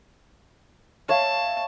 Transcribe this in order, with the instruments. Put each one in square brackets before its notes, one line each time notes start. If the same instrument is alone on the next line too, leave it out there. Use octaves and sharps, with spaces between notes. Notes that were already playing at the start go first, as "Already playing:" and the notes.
[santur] C#5 E5 F5 [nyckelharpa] A5